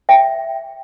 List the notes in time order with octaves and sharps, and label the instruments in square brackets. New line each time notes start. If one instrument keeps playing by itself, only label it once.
[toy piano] E5 G5